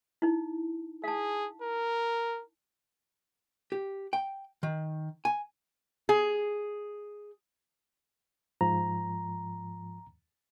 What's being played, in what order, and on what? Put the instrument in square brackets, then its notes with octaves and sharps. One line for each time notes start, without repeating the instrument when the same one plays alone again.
[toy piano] D#4 E4
[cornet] G#4 [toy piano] F5 A5
[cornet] A#4
[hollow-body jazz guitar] G4
G5
D#3
G#5
[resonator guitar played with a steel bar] G#4
[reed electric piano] G#2 F3 [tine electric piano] A#5